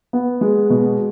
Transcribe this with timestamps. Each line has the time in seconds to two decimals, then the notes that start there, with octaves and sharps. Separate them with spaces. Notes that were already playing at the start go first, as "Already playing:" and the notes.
0.13 B3
0.41 G#3
0.70 B2